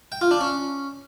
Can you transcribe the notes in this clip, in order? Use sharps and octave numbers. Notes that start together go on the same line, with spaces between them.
G5
F4
D4
C#4